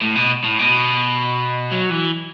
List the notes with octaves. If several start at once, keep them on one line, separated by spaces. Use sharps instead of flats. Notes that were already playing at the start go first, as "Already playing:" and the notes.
A2
B2
A2
B2
F#3
E3